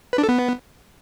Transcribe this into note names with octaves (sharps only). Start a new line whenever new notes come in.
B4
D4
A4
B3